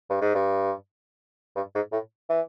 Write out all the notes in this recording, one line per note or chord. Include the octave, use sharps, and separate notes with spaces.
G2
G#2
G2
G2
G#2
A2
E3